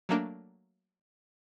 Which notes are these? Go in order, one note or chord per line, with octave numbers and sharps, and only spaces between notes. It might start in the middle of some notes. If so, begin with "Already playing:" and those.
F#3 A3 A#3 D4